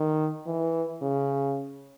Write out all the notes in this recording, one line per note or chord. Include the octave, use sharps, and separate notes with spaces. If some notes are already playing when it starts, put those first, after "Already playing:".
Already playing: D#3
E3
C#3